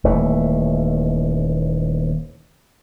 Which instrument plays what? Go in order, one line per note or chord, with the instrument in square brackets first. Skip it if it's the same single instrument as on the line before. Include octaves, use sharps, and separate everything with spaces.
[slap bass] D#1 D#2 E3 A3